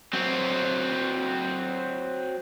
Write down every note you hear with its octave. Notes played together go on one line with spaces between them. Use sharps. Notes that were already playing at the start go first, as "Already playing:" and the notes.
F#3 C4